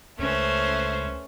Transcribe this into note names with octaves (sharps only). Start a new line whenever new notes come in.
C#2 A3 C#4 B4 C5